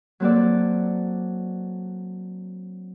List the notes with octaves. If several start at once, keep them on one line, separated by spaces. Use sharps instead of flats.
F#3 A#3 C4 F#4 A4 D5